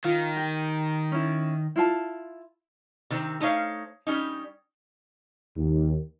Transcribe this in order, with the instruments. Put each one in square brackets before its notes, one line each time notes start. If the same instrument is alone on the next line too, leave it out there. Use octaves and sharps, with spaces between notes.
[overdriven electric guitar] D#3 [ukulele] F4
[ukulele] G4
C#4 E4
E4 F4 A5
[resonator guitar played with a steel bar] C3 D#3 C4
A3 D#4 C5 C#5 F5
G3 C#4 D#4
[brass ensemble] D#2